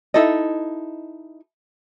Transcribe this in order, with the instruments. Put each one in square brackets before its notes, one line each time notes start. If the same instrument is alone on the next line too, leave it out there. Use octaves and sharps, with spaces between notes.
[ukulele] D#4 E4 A4 D#5